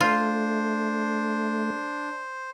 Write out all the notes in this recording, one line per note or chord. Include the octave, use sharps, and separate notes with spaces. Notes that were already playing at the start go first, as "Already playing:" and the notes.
A3 D4 F4 C5